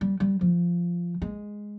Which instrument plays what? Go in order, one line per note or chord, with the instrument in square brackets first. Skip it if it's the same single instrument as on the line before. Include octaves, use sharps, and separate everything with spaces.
[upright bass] G3
G3
F3
G#3